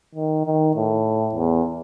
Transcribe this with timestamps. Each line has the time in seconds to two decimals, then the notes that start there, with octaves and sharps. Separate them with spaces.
0.15 D#3
0.45 D#3
0.76 A2
1.35 E2